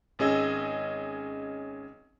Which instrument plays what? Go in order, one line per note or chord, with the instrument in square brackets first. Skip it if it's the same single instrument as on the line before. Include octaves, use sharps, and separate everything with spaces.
[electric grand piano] G#1 C#4 G#4 D#5 E6